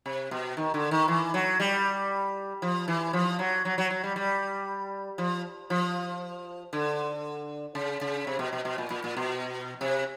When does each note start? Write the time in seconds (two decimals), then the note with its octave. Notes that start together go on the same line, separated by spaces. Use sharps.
0.06 C3
0.31 B2
0.57 D#3
0.74 D3
0.91 D#3
1.08 E3
1.34 F#3
1.60 G3
2.62 F3
2.88 E3
3.13 F3
3.39 F#3
3.65 F#3
3.78 F#3
3.90 F#3
4.03 G3
4.16 G3
5.18 F3
5.70 F3
6.73 D3
7.75 C#3
8.01 C#3
8.27 C3
8.39 B2
8.53 B2
8.65 B2
8.78 A#2
8.90 A#2
9.04 A#2
9.17 B2
9.81 C3